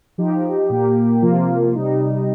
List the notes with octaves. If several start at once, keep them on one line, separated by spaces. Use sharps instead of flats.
F3 D#4 G4
A#2 A#3 G4
C3 F3 A#3 F4
C3 G3 D#4